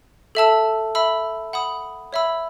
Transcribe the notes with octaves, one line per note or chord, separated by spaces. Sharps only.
A4 E5 A5 E6
E5 B5 E6
F#5 B5 D#6
C#5 E5 B5 E6